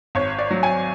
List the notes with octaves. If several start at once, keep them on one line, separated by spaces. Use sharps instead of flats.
G#1 C#5
D5
F#3
G#5